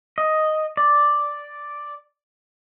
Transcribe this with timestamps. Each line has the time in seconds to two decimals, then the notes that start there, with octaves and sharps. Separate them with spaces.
0.18 D#5
0.77 D5